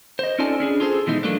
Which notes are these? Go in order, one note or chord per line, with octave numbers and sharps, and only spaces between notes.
C5 D#5
C#4 D#4 F4 A4 D5 G#5
C#4 D4 G#4
F4 G#4 A4 C5
B2 E3 G#3 D#4
F#3 A3 A#3 D4